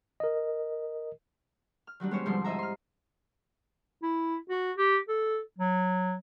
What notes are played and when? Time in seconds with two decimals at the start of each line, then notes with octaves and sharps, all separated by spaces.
0.20 A#4 D#5
1.87 F6
2.00 D#3 F#3 G3 D4
2.11 G#3 B3 C#4 G4 C5 C#5
2.25 D2 G#2 F3 G3 C4 C6
2.45 E4 C5 D#5 E5 A#5
2.59 C6 F6
4.03 E4
4.50 F#4
4.77 G4
5.08 A4
5.58 F#3